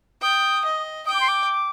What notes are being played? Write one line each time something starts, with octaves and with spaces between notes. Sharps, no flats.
G5 D#6
D#5
G5 D#6
D6
C6
D6